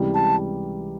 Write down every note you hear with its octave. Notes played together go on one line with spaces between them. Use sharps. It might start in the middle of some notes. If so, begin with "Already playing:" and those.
Already playing: C#2 C3 E3 G3
A5